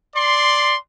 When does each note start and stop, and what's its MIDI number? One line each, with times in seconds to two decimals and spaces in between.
0.15 0.77 74
0.15 0.77 84